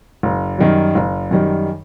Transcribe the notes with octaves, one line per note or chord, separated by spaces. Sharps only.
F#1
F#2 D#3 G3
F#1
F#2 D#3 G3